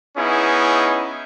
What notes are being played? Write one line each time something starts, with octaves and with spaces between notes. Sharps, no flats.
B3 C#4 D#4 E4 G#4